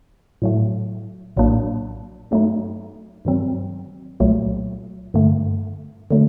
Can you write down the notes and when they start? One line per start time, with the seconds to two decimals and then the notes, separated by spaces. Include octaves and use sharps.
0.42 A2 F#3 A3
1.37 A#1 A2 F#3 A#3 D4
2.31 G2 F#3 A3 D#4
3.25 G2 D#3 F#3 C4
4.20 C2 A#2 F#3 A3
5.14 G2 D3 A3
6.11 D3 F#3 A3